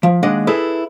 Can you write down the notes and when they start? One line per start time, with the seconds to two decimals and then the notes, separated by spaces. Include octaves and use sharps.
0.03 F3
0.23 D#2 G#3 D4 D#5 F#5
0.47 E4 G#4 A4 B4